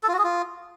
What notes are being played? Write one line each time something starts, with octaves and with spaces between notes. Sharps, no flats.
A4
F4
F#4
G#4
F4